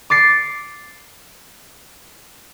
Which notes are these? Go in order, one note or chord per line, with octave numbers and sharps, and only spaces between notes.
D6 A6 C7 C#7